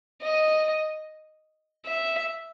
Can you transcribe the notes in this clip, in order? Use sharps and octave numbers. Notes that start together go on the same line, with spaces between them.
D#5
E5